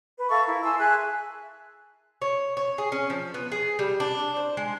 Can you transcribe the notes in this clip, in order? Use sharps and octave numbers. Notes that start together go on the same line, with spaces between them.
B4
A4 E5 F5 C#6
E4 A#4
G#5 A5 C6 E6
G#4 E5 G#5 F#6
C#5
C#5
G#4
C#4
F3
B3
G#4
G3
D4
C5
G#3